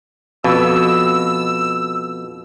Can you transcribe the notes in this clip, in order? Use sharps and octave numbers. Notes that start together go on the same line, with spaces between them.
F2 B2 E6